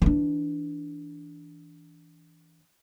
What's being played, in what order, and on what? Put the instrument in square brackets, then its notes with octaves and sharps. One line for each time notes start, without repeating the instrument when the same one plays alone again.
[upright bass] E3 D4